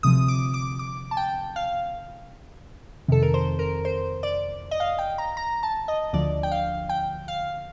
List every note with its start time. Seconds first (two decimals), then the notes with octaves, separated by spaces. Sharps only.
0.03 D2 C3 F3 D#6
0.28 D6
0.54 D6
0.79 D6
1.11 A5
1.17 G5
1.56 F5
3.08 F2 C3 D#3 A4
3.23 A#4
3.34 C5
3.59 A#4
3.85 C5
4.23 D5
4.71 D#5
4.80 F5
4.99 G5
5.18 A#5
5.37 A#5
5.63 A5
5.88 D#5
6.13 D2 D3 F3 D5
6.43 G5
6.51 F5
6.89 G5
7.28 F5